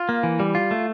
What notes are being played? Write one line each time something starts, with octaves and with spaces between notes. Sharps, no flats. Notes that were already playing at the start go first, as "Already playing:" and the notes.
Already playing: F4
A#3
E3
G3
F4
A3